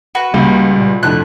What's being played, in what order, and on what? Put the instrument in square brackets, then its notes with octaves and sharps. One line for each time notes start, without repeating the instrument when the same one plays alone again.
[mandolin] F#4 B4
[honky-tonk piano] C#2 [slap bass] G3 [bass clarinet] A#3
[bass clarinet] A#2
[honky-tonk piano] F2 A2 D3 [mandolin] F#6